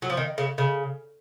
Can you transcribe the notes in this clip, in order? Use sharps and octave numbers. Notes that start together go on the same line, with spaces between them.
F#3
F3
D#3
C#3
C#3